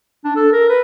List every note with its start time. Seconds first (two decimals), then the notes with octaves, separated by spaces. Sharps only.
0.24 D4
0.36 A4
0.53 A#4
0.69 B4